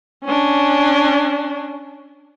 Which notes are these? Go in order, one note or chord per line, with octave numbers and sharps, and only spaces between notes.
C#4 D4